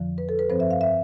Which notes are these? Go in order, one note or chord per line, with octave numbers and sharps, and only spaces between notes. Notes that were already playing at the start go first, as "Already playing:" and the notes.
Already playing: F2 D3 F3
B4
A4
B4
G2 F3 C4 C5
E5
F5
E5